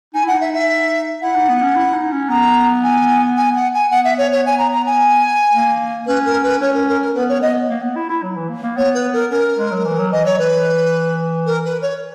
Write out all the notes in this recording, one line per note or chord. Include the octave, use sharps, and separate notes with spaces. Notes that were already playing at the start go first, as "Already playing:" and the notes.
D#4 G#5
E4
D#4 F#5
E5
E5
E4 F#5
D#4
B3
C#4
E4
D#4
C#4
B3 A#5
G#5
G#5
F#5
G#5
B3 F#5
E5
C#5
C#5
G#5
A#5
A#5
G#5
A#3
C#4 B4
A#4
B4
C#4 C#5
A#4
A#4
A#4
B3 B4
C#5
B3 D#5
A#3
B3
E4
E4
F#3
E3
A#3
A#3
B3 C#5
B4
A#4
C#4 A#4
G#3
F#3
E3
F#3
E3 D#5
F#3 C#5
E3 B4
A#4
B4
C#5